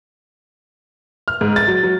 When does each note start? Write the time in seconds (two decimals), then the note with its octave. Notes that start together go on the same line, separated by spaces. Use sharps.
1.28 F6
1.41 G#2
1.56 A6
1.68 F#3
1.83 F#3